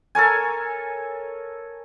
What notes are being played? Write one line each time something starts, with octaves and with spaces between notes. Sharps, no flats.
A4 A#4 C#5 G#5